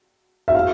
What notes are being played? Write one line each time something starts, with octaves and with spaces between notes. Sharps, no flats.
E5
F5